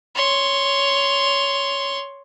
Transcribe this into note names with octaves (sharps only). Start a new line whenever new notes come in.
C#5 C6